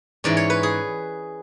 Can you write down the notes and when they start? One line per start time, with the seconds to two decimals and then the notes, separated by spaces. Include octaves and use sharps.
0.24 G#2 E3 G#3 C#4 D5
0.37 C#5
0.50 B4
0.63 G#4